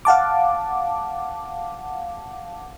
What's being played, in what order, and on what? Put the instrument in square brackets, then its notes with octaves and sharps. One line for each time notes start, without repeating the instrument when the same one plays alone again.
[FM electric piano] F5 F#5 A5 D6